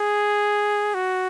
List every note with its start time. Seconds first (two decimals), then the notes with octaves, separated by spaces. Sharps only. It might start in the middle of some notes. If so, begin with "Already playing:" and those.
Already playing: G#4
0.95 F#4